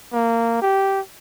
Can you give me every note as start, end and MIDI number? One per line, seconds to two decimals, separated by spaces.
0.12 0.59 58
0.62 1.00 67